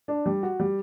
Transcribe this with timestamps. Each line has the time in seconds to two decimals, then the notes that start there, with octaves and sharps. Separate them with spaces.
0.08 D4
0.26 G3
0.43 F#4
0.60 G3